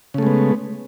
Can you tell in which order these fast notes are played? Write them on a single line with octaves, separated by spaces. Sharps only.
C#3 A3 G#3 B3